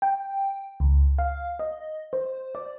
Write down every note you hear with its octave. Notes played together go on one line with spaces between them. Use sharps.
G5
C#2
F5
D#5
C5
D5